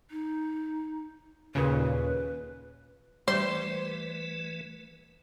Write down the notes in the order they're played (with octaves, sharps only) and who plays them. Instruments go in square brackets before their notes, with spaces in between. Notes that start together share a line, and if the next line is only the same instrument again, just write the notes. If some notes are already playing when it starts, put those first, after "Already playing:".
[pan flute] D#4
[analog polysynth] D#2 A#2 C#3 [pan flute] B4
[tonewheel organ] E3 A3 B4 [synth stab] G3 [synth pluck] C5 [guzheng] C6